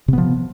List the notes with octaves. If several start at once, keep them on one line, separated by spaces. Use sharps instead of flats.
C3 F3 B3